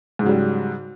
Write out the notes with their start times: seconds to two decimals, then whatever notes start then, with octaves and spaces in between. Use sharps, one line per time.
0.19 G#2
0.23 C#3
0.26 F#3
0.29 G3